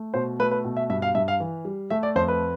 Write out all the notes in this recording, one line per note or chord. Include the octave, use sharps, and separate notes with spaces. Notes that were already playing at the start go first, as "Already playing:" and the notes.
Already playing: A3
B2 C5
A3 B4
B4
B2
E5
G2 E5
F5
G2 E5
F5
E3
G3
A3 E5
D5
F2 C5
B4